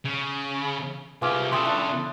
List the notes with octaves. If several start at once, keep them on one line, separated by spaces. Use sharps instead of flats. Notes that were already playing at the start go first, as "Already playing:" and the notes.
C#3
C2 F4 G4 G#4 B4 E5 D6 F6
C#3 A4 B4 E5 G5 C6 D#6
D4 E4